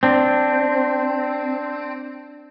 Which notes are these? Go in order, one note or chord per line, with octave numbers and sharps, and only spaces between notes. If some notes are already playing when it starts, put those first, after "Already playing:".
C4 D4